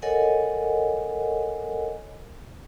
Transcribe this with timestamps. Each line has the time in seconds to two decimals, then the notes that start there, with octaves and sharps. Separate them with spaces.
0.02 A4 A#4 C#5 D#5 F#5 G#5